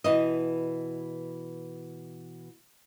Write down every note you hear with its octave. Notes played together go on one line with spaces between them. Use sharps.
B2 E3 D#5